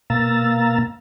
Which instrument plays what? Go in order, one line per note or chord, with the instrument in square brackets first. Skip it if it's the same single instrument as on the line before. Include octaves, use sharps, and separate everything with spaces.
[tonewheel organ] B2 A#3 F5 A#5 E6 A6